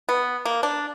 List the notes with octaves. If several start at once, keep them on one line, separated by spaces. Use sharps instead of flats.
B3
A#3
D4